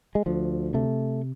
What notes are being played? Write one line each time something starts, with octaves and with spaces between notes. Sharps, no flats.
G#3
D2 F3
C3 A3